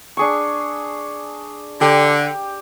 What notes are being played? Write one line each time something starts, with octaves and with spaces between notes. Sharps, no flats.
D4 G#4 C#6
D3 G4